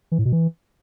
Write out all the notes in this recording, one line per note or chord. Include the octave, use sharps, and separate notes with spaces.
E3
A2
B2
E3